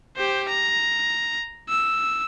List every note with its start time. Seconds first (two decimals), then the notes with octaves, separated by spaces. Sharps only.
0.17 G4 C5
0.49 A#5
1.69 E6